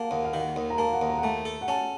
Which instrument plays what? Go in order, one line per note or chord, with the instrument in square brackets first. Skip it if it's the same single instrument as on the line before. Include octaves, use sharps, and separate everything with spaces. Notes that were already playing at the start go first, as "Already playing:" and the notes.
Already playing: [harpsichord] A#3 [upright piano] F#5 A5
[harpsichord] D#2 [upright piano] F#5
[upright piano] F5
[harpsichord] D#3 [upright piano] F#5
[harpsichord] D#2
[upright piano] A#5
[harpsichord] A#3 [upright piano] A5
[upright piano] F#5
[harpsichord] D#2
[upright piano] A#5
F#5
[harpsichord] A3 [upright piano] A5
[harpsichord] A4
[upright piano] F#5
[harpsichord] C#4 [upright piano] A5